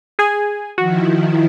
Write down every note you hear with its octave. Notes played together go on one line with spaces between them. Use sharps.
G#4 G#5
D#3 F3 E4 F#4